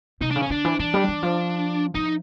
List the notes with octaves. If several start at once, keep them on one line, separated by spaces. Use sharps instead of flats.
C3 D#4
C#3 D4
C#4
D3 D4
E3
E3 D4
G3
E3
F3
F3 D#4